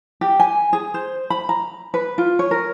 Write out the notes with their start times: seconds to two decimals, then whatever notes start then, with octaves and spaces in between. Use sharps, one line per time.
0.21 G4
0.40 G#5
0.73 G#4
0.94 C5
1.30 B5
1.49 A#5
1.94 B4
2.18 F4
2.39 C#5
2.51 A#4